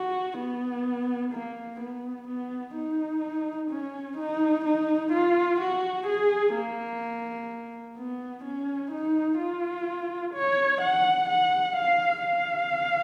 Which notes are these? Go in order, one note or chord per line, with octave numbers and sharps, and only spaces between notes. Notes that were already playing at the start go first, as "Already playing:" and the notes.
Already playing: F#4
B3
A#3
B3
B3
D#4
C#4
D#4
D#4
F4
F#4
G#4
A#3
B3
C#4
D#4
F4
C#5
F#5
F#5
F5
F5